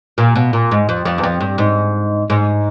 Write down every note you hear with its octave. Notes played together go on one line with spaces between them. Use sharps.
A#2
B2
A#2
G#2
F2
F2
E2
F2
G2
G#2
G#2